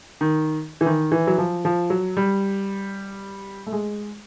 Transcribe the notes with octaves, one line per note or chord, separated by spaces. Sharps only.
D#3
E3
D#3
E3
F#3
F3
F3
F#3
G3
A3
G#3